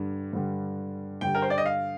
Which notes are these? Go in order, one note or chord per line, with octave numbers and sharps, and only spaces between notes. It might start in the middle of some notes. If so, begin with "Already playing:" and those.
Already playing: G2 D3 G3
G2 D3 G3
G2 D3 G3 G5
A#4
C5
D5
D#5
F5